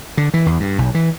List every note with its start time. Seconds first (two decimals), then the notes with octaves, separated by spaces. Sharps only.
0.17 D3
0.34 E3
0.46 E2
0.60 G2
0.78 B1
0.94 E3